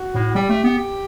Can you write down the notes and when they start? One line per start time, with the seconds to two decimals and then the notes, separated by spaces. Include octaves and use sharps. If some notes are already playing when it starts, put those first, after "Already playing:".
Already playing: F#4
0.15 A2
0.35 G3 G4
0.49 A3
0.64 B3
0.78 G4